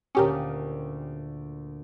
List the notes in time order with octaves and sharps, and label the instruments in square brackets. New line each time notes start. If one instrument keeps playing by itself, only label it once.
[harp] D2 A#2 D#6 [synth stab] C#4 G4 A#4